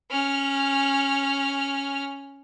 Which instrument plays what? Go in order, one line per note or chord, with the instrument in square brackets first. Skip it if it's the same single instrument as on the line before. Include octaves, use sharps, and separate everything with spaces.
[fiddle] C#4 F6